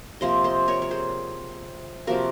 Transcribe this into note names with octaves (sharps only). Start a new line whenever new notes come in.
C3 F3 A#3 C5 D#5
C5 D#5
A#4 C#5
C#5
G#4 C5
C3 F3 A#3 F#4 A#4